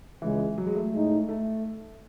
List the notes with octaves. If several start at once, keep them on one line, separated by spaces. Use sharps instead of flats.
C#2 C#3 E3 G#3
F#3
G#3
A3
A2 G#3 D#4
A3